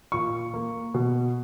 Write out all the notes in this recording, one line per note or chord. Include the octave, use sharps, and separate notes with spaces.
A#2 C#6
A#3
B2